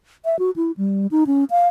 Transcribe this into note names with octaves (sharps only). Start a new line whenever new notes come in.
E5
F#4
E4
G3
D#4
C#4
F5